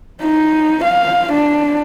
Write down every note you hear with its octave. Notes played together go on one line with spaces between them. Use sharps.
D#4
F5
D4